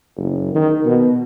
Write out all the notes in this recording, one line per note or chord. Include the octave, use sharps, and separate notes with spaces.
F#1
D#3
B2